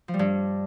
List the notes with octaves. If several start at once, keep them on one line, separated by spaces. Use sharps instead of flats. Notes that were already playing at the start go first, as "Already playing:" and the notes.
F3
G3
G2